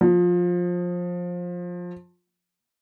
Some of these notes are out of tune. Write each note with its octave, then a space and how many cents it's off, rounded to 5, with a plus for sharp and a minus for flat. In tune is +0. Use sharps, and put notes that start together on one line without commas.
F3 +20